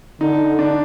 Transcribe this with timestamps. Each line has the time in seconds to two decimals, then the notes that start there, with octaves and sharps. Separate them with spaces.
0.21 D3 D#4
0.59 D4